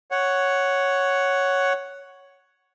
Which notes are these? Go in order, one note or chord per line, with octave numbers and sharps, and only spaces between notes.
C#5 F#5